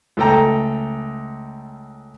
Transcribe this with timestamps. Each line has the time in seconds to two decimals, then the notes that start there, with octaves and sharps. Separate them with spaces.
0.17 C#2 A3 A4 G5 A#5